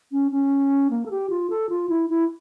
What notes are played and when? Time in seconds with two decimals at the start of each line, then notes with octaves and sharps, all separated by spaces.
0.12 C#4
0.32 C#4
0.90 A#3
1.06 A4
1.11 G4
1.30 F4
1.50 A4
1.69 F4
1.89 E4
2.10 E4